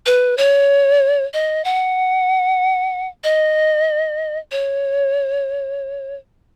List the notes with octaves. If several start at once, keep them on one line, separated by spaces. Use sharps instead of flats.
B4
C#5
D#5
F#5
D#5
C#5